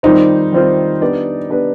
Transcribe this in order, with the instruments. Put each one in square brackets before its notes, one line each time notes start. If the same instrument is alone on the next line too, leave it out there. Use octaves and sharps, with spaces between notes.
[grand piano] D#3 G3 C4 F4 C5 [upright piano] D#4
[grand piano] D#3 G3 C4 F4 C5
B3 D4 G4 B4 D5
B3 D4 G4 B4 D5